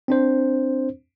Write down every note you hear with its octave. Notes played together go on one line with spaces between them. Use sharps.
C4 D4 C5